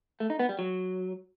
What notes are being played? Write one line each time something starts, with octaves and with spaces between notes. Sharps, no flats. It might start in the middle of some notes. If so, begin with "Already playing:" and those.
A3
D#4
B3
G3
F#3